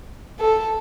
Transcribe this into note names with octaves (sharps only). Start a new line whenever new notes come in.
A4